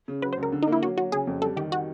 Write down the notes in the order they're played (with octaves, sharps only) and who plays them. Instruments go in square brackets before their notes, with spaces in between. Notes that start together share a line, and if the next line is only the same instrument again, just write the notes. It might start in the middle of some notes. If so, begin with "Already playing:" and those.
[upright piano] C#3
[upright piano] F#3 [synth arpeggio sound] B4
[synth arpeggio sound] C5
[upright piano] C#2
[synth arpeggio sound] A#4
[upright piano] D3
[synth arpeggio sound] D#4
[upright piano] A#3 [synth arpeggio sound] E4
[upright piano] F#3 [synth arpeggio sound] F#4
[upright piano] F#3 [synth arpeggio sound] F#4
[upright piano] C#3 [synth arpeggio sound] G#4
[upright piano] F2
[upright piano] G3 [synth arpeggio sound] A4
[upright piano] D#3 [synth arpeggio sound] G4
[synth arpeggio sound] F#4